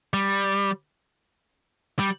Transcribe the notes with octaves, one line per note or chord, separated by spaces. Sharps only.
G3
G3